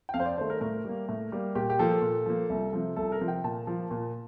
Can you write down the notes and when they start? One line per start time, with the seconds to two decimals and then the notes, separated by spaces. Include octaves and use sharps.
0.09 G5
0.14 F2 F5
0.20 C5
0.26 D5
0.37 D#3 A3 C5
0.50 A#4
0.61 A2 A#4
0.85 G3 A#3
1.09 A2
1.32 G3 A#3
1.55 A#2 G4
1.70 G4
1.79 F3 A#3 A4
2.02 A#2
2.26 F3 A#3
2.50 C2
2.73 C3 F3
2.96 C2 A4
3.12 A#4
3.21 C3 F3
3.28 G5
3.44 A#2 A5
3.67 F3 A#3
3.91 A#2